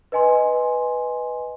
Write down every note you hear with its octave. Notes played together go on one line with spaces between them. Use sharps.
B4 D#5 G#5 C6